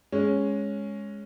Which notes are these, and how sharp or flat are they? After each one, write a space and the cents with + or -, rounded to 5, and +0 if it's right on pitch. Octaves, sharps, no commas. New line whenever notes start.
G#3 +0 C#4 +0